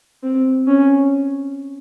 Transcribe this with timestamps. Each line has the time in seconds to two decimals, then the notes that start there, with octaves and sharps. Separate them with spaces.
0.23 C4
0.68 C#4